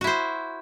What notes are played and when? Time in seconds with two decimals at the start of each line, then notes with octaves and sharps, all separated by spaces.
0.01 F#4
0.04 E4
0.07 C5